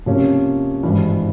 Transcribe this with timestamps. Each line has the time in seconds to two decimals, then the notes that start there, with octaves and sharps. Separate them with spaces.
0.06 C3 F3 A#3 C#4
0.83 G#1 G2 E3